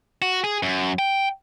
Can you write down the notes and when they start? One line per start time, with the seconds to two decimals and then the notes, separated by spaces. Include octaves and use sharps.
0.22 F#4
0.44 G#4
0.63 F#2
0.99 G5